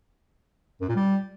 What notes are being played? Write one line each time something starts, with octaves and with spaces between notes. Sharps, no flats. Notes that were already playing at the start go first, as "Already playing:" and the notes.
F#2
A#2
G3